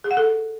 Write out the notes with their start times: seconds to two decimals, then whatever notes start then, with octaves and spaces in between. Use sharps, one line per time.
0.04 G#4
0.11 F#5
0.17 A4